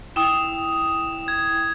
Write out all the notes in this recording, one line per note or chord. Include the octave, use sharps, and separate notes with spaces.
E4 G5 D#6 E7
G#6